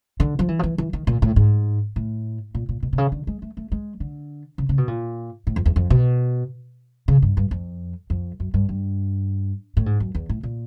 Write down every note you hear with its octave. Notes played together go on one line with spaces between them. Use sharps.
D3
F3
E3
F3
E3
E3
D#3
A#2
A2
G#2
A2
A#2
A#2
B2
C3
C#3
D3
G#3
A3
A3
G#3
D3
C#3
C#3
B2
A#2
A2
F2
E2
F2
B2
C#3
G2
G2
F2
F2
F#2
G2
G2
A2
G#2
F#2
E2
A2
A#2